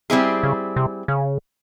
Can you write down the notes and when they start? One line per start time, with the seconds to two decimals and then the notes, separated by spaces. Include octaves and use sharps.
0.10 G3 C4 E4 G#4
0.43 C#3
0.76 C3
1.08 C#3